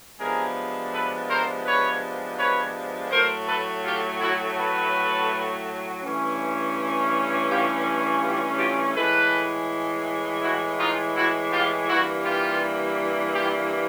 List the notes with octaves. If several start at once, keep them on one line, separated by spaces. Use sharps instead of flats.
C3 F3 G#3 B3 D4 G#4 A#4
A4 B4
A#4 C5
B4 C#5
B4 C#5
A2 F#3 A3 A#4 C5
A4 B4
F4 G4
E4 F#4
A4 B4
G2 E3 A3 C#4
F4 G4
F4 G4
F4 G4
A2 E3 G#3 A4 B4
E4 F#4
D#4 F4
E4 F#4
F4 G4
G2 E3 G3 A#3 E4 F#4
F4 G4
F4 G4